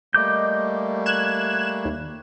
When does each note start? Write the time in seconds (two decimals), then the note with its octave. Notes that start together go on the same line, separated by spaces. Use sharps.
0.14 G3 A3 A#3 D#5 D6 G6
1.06 F#6 G#6 E7
1.85 D#2